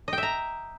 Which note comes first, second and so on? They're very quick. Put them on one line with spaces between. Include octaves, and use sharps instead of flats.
D#5 G5 E5 A#5